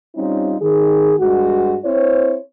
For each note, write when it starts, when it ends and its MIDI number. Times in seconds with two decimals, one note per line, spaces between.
0.15 0.55 55
0.15 0.55 60
0.15 0.55 61
0.15 0.55 63
0.15 0.55 65
0.60 1.14 51
0.60 1.14 68
1.19 1.76 43
1.19 1.76 56
1.19 1.76 66
1.84 2.36 60
1.84 2.36 64
1.84 2.36 72
1.84 2.36 73